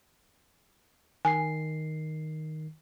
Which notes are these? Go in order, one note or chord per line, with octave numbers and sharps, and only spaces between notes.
D#3 G#5 C7